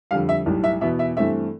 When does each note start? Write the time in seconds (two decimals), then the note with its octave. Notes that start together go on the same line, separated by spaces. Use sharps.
0.11 F2 D3 G3 F5
0.29 E5
0.46 B1 A2 G3
0.64 E5
0.81 E2 B2 B3 E5
0.99 E5
1.17 G2 E3 A3 C4 E5